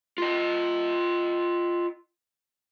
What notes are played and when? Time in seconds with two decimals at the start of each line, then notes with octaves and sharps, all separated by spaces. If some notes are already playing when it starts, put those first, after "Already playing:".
0.18 F4 D#5